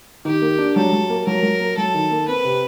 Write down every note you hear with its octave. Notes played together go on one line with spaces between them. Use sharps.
D#3 G4
A#3
D4
F#3 A4
F#3
A#3
F#3 A#4
F#3
A#3
F#3 A4
D#3
A#3
C4 B4
C3